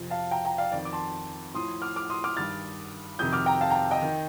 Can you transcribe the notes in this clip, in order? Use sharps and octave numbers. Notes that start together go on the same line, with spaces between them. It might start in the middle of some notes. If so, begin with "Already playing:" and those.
Already playing: F2 C3 F3
F5 A5
G5 A#5
G5 A#5
D5 F5
F2 D#3 D5
D6
A5 C6
A2 F3 C6 D#6
D6 F6
D6 F6
C6 D#6
D6 F6
G2 D#3 F6 A6
F2 C3 D#3 D#6 G6
D6 F6
G5 A#5
F5 A5
G5 A#5
D#5 G5
D#3